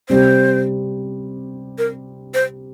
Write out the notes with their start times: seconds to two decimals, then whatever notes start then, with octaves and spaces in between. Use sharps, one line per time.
0.09 C3 G3 C4 G4 C5
1.78 A#4
2.34 C5